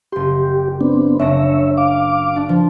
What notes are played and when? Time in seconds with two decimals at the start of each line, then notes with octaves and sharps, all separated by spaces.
0.12 F#1 G4 C6
0.81 B3 C4 D4
1.19 F#1 D4 C#5 E5 A#6
1.77 F5 D6
2.36 D4
2.49 F3